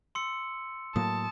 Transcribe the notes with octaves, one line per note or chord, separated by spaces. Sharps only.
C6 E6 C#7
A2 F#3 A#3 A5 D#6